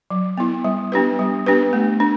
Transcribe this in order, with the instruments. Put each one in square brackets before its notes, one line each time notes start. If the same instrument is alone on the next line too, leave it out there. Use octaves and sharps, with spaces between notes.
[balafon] F#3
B3 E4
G3
B3 D4 G4 B4
G3
B3 D4 G4 B4
A3
D4